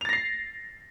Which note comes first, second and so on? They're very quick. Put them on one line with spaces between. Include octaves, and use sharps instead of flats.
F7 A6 A#6 C7